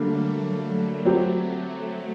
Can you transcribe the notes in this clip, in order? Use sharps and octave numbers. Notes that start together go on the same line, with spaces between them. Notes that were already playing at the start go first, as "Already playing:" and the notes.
Already playing: D3 F#3 G3 A3 A#3
F#3 C4 G4